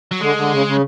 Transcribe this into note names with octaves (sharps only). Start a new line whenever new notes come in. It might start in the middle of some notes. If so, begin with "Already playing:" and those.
F#3
D3 G#3
D3
C#3
C#3